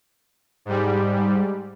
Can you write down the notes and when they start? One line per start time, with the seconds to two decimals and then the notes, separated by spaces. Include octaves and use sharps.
0.65 G#2 G3